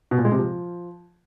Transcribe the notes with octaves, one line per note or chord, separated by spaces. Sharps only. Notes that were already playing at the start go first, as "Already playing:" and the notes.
B2
A#2
G#3
C3
F3